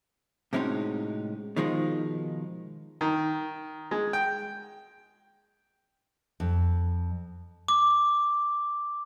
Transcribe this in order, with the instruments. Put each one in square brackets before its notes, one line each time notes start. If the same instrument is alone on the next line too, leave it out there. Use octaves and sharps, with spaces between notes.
[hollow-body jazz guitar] A2 C3 G#3 C#4 D#4 F#4
B2 D#3 F3 G#3 D#4
[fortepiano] D#3
G#3
G5
[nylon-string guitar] F2
[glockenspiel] D6